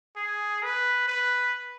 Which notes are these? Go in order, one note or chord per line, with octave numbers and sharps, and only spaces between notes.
G#4
B4
B4